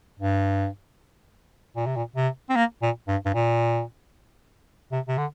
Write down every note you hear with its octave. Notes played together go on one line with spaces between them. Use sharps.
G2
A#2
C3
A#2
C3
C4
A#3
A#2
G2
G2
A#2
C3
C3
D3